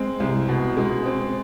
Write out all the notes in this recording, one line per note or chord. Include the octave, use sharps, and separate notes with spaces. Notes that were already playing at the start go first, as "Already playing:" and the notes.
Already playing: G#3 C4
C2
B2
G#3
C4